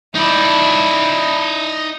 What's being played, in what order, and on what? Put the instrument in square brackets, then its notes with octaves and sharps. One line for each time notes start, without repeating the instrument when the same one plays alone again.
[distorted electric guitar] D#4 D5 [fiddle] E4